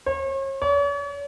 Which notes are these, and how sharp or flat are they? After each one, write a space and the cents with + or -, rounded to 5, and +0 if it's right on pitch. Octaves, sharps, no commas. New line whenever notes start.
C#5 -40
C#5 +45